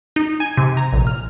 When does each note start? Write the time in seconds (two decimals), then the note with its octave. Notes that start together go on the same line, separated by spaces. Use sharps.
0.16 D#4
0.40 G#5
0.57 C3
0.77 A#5
0.93 A#1
1.07 F6